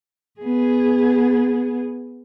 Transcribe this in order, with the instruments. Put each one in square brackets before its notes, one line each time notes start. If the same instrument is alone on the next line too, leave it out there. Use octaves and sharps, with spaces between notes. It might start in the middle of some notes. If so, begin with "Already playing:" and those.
[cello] B3 G#4